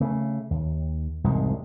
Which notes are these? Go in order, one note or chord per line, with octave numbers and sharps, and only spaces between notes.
C#3 A3
D#2
E1 C2 G#2 G#3